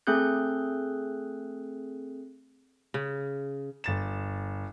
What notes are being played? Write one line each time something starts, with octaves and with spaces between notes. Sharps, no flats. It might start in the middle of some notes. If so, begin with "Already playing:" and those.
A3 C4 G#4 A4 F#6 G6
C#3
G1 A6 E7